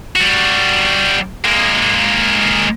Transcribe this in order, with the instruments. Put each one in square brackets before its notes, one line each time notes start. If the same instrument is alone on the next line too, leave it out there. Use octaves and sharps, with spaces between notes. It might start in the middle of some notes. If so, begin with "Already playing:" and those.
[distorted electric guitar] G3 F#4
G#3 A#3